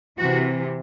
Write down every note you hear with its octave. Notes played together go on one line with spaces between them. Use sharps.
C3 E3 F#4